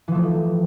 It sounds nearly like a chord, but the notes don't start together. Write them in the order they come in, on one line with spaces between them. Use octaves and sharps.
E3 F3 A3